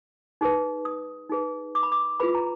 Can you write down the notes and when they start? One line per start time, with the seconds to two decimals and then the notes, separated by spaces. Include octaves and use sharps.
0.41 D#4 G#4 B4
0.85 D#6
1.30 D#4 G#4 B4
1.75 D6
1.83 B5
1.92 D6
2.20 F4 G#4 B4 B5
2.35 A#5